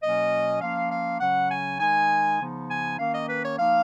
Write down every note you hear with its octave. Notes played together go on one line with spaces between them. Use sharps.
B2 F#3 A#3 C#4 D#5
F3 A#3 C#4 F5
F5
C#3 F#3 C#4 F#5
G#5
D#3 G#3 D#4 G#5
C#3 F3 B3 D#4
G#5
D#3 A#3 C#4 F5
D#5
B4
C#5
F3 A#3 D#4 F5